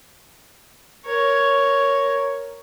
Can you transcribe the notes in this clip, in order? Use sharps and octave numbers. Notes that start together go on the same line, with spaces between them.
A#4 C#5